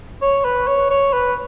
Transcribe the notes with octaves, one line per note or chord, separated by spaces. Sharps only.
C#5
B4
C#5
C#5
B4